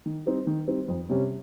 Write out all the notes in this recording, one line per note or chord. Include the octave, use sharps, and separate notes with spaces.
D#3
G3 C4 D#4
D#3
G3 C4 D#4
F2
C3 G3 C#4